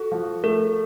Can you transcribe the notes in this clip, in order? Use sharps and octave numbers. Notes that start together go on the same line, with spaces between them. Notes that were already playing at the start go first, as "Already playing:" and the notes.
Already playing: F#4 A4
F3
A3 A#4